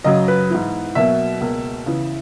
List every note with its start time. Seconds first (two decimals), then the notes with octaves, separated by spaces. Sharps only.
0.04 F#2 C#3 F#3 D#5
0.28 B4
0.50 G#2 E3 B3 E4
0.95 B2 F#3 A#3 E5
1.40 C#2 B2 A#3
1.86 C#3 E3 B3